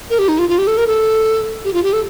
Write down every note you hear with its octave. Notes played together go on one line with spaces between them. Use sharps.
A#4
G4
D#4
F4
F4
G4
A4
A#4
A4
G4
F4
G4
A4